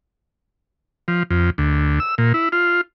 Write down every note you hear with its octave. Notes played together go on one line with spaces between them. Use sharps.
F3
F2
D2
E6
A#2
E4
F4